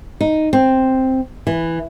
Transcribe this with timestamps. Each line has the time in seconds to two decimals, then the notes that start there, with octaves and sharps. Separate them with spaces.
0.21 D#4
0.53 C4
1.47 E3